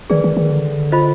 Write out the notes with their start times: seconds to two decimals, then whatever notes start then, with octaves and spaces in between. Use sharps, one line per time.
0.10 D#3 G#4 B4 D5
0.24 D#3
0.37 D#3
0.51 D3
0.92 F4 C5 D#5 B5